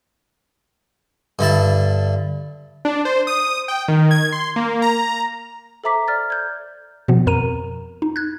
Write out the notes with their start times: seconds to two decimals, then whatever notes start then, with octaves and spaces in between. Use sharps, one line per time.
1.39 G2 D3 E4 A5
2.85 D4
3.05 C5
3.27 D#6
3.68 G5
3.88 D#3
4.11 G#6
4.32 C6
4.56 A#3
4.82 A#5
5.84 A4 C5 E5 A#5 D6 B6
6.08 D5 F6 A6
6.30 G6 G#6
7.08 B2 F3 B3
7.27 F2 A#4 A#5 D#7
8.02 D#4
8.16 F#6 G#6